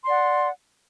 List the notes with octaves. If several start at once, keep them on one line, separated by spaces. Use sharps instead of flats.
D5 F#5 C6